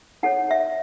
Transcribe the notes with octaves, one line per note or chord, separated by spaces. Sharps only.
D#4 A4 C#5 F#5
E5